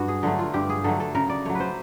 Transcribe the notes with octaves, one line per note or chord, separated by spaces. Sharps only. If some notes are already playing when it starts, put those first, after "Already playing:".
Already playing: G2 F#4
G#4
D3 F#3 A3 A4
F4
G2 G4
G#4
D3 F#3 A3 A4
A4
C#3 A#4
D5
F#3 A3 C#5
B4
C5